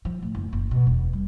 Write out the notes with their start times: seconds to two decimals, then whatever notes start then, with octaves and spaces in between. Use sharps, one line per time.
0.05 F3
0.22 A2
0.35 F#1
0.53 F#1
0.71 B2
0.87 E1
1.13 G3